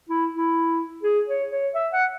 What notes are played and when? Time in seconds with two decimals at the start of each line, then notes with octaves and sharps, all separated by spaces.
0.09 E4
0.33 E4
1.03 G#4
1.27 C#5
1.51 C#5
1.75 E5
1.93 F#5